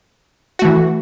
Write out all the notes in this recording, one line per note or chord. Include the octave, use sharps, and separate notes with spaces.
E3 A3 F#4